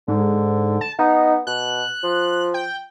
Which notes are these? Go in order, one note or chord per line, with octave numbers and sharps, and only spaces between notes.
G#2 D3
A5
B3 D#4
B2 F#6
F3
G5